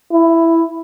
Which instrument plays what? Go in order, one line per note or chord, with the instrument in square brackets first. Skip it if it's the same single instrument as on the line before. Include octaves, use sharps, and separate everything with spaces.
[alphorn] E4